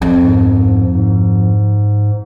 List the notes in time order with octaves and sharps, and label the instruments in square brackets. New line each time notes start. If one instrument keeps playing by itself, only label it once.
[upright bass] F2
[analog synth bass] G#2
G#2